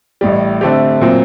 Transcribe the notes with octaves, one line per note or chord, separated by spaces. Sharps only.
A1 A2 G3
D3 A3 C4 G4
A#2 F#3 C4